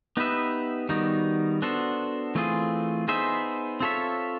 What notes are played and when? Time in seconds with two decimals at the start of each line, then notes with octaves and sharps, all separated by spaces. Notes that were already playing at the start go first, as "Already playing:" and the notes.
0.17 B3 D#4 G4 B4 E5
0.89 D#3 G3 B3 D#4 F#4
1.62 B3 D4 F#4 A4 C5
2.35 E3 A3 C4 F4 G#4
3.08 B3 D#4 G#4 C5 E5
3.80 C4 F4 A4 C#5 E5